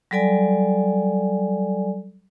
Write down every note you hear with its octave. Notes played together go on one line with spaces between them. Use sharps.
F#3 G3 A4 D5 G#5